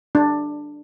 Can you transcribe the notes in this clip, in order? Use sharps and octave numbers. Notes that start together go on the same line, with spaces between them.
D4